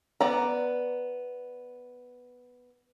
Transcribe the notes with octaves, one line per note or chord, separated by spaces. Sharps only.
B3 D5 A#5